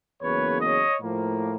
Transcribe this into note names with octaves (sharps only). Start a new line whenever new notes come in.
E2 C#3 F#3 A#3 B4 C#5
C#5 D#5
A2 F3 A#3